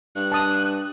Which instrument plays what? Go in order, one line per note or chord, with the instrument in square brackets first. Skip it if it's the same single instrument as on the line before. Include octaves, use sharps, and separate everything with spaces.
[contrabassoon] G2 [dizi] F#6
[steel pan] A5 D#6